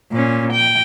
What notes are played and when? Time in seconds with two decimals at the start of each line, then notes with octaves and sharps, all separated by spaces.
0.12 A#2 C#4
0.52 G5